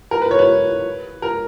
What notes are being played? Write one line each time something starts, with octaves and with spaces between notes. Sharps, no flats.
A#4
B4
C#5
B4
A#4